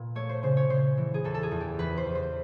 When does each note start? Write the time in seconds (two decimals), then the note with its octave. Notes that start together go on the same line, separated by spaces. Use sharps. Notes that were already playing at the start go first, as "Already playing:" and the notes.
Already playing: A#2 B3
0.15 A3 C#5
0.29 C5
0.43 C#3 C5
0.57 C#5
0.70 C#3 C5
0.97 E3
1.14 G#4
1.24 E2 A4
1.34 A4
1.43 G#4
1.51 E2
1.61 G4
1.79 E2 B4
1.97 C5
2.06 E2
2.15 C5